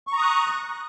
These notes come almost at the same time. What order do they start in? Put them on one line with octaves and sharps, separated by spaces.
C#6 A#5 D#6 F#6